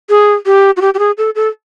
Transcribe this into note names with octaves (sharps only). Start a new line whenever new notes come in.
G#4
G4
F#4
G4
G4
G#4
A4
A4